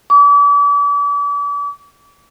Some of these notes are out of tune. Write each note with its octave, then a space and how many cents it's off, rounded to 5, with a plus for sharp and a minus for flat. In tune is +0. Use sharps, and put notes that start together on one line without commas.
D6 -40